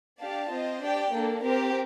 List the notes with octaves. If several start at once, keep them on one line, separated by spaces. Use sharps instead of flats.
D4 G4 D5 F5 A5
C4 F4 C5 D#5
D4 G4 D5 G5
A#3 D4 A4
C4 G4 A#4